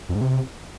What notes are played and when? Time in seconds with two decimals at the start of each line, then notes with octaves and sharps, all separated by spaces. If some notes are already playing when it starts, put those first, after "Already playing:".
0.09 F2
0.15 G#2
0.21 C3